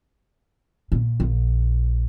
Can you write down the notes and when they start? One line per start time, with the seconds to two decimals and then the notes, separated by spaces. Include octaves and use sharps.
0.92 A#2
1.20 A#1